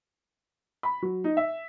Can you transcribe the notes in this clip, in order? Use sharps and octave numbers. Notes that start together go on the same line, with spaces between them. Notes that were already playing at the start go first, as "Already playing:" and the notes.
B5
F#3
D#4
E5